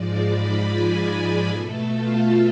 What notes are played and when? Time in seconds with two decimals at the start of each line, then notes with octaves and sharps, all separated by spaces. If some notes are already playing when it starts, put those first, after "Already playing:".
Already playing: G#2 F3 G#3 D5
0.25 B5
0.66 G#5
1.48 B2 A3 A4
1.89 F4